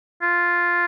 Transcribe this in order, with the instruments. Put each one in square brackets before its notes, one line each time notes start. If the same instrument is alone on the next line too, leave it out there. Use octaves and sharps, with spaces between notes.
[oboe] F4